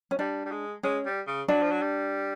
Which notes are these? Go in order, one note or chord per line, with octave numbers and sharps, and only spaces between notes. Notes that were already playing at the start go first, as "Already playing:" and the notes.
C#4
G3 D4
G3
G#3
G#3 C#4
G3
C#3
F#3 D4
F3
F#3
G3